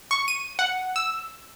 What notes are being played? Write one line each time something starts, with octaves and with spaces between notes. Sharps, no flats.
C#6
D#7
F#5
E6